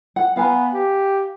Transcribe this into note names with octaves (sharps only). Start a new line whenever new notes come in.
F#5
B3 F5 G#5 A#5
G4